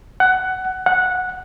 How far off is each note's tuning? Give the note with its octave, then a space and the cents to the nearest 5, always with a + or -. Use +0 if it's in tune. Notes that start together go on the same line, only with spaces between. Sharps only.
F#5 +15
F#5 -10